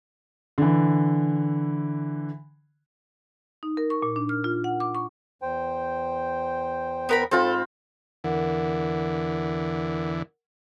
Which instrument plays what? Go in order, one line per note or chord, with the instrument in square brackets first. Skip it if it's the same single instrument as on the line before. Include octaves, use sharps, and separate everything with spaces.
[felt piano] D3 E3
[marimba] D#4
A#4
C#6
A#2
D4
F6
F4
F#5
D6
C#6
[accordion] E2 C5 G5
[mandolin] B3 A#4 B5
[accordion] G#2 [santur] C4 F4 B5 [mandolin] A4
[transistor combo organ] E2 D3 E3 [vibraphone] A#4 F#5